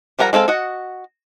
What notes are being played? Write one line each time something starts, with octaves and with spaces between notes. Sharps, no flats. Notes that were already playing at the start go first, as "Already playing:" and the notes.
F3 G3 A#4 F#5 A#5
G#3 C4 A4 F5
F#4 D#5 F#5